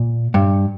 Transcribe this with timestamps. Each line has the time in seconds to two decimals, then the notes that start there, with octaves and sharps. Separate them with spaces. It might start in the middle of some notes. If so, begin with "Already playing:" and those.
Already playing: A#2
0.34 G2